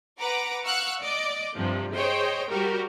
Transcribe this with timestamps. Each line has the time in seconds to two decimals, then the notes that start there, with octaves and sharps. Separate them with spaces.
0.20 B4 F#5 A#5 D6
0.66 F5 F#5 C#6 E6 F#6
1.01 D5 D#5 D6
1.55 G2 C3 F3
1.95 G#4 C5 C#5 D#5 G5
2.49 G3 F#4 G4 A#4